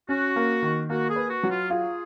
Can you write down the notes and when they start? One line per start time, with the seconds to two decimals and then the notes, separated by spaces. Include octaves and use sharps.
0.09 C#4 F#4
0.36 A#3
0.62 D#3
0.90 A#3 F#4
1.09 G#4
1.16 B4
1.30 F#4
1.43 F#3
1.51 F4
1.70 F4 G#4